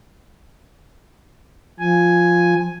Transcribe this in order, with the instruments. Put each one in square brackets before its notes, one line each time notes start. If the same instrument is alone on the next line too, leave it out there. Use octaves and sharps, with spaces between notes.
[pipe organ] F3 G#5